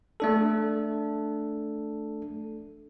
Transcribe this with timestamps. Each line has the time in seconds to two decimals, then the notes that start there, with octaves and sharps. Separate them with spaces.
0.20 A3 D4 A4